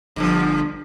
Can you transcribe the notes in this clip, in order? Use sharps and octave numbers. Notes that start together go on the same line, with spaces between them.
G1 G2 D3 F3